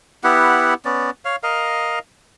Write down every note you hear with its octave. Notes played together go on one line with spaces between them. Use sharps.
B3 E4 G4 F#5
B3 C#4 D5
C#5 F5
A#4 D#5 F5